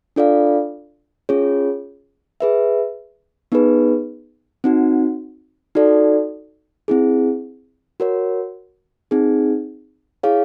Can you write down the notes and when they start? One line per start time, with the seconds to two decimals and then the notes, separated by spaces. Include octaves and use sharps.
0.16 D4 F4 A4 D5 F5
1.29 C#4 F4 G#4 C#5
2.40 G#4 B4 E5
3.52 B3 D#4 G#4 B4
4.64 C4 D#4 F#4
5.75 D#4 F#4 A4 D5
6.88 C4 E4 G#4
8.00 F#4 A#4 C#5
9.11 C4 D#4 G#4
10.23 E4 G#4 C#5 F5